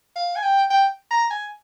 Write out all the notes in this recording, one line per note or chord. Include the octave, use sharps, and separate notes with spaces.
F5
G#5
G5
G5
A#5
G#5